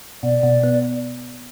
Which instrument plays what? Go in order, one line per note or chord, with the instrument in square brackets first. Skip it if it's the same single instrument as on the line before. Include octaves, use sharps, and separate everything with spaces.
[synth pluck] B2 [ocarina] D5
[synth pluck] B2
B3